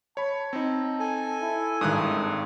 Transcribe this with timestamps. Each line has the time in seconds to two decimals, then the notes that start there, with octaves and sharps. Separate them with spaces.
0.17 C#5 A5 B5
0.53 C4 D#4
1.00 A4 G#5
1.41 E4
1.81 G#1 G2 D#6 F#6